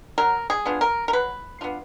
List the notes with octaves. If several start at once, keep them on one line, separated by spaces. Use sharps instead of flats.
F#3 A#4
G#4
B3 D4 F4
A#4
A#4
F#3 B4
B3 D4 F4